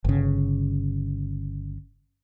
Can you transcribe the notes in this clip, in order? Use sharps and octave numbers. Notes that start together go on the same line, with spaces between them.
G1 C#3